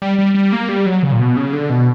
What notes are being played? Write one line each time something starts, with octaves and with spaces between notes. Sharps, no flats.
G3
G3
G3
A#3
G3
F#3
C#3
A#2
B2
C#3
D3
B2